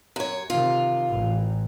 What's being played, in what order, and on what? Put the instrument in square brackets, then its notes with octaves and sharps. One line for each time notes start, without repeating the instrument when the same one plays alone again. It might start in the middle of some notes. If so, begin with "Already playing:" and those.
[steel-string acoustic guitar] F#2 C#5
[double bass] C3 D#3 [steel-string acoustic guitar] F4
[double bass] A1